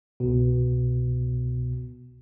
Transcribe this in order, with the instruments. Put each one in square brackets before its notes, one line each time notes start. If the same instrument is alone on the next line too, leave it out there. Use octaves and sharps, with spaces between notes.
[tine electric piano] C2 B2